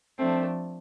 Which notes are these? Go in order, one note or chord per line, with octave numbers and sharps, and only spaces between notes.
F3 A3 C4 D4